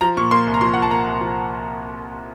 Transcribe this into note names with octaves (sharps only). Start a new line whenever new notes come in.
F3 A#5
A#2 C#6
A#3 C6
C2
A#5
F3 C6
A#2 F#5
A5
A#3 A#5
C2
F3